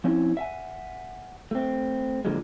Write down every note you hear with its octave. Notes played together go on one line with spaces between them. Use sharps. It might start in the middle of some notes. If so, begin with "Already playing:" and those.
F3 C4 C#4 E4
E5 F#5 G#5
A3 C4
A#2 D3 F3 F#3 G#3